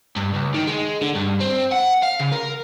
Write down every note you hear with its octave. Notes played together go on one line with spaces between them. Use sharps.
G2
C#2
D#3
G#3
D3
G2
C4
F#5
F5
C#3
A#4